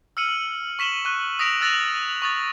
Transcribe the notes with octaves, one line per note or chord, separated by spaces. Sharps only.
E6 F6 C#7 D#7 F#7
C#6 B6 E7 F#7 G7
C#6 F#6 G7
D#6 A#6 B6 D7 F7 F#7
E6 F#6 A6 A#6 F7 F#7
C#6 D#6 A6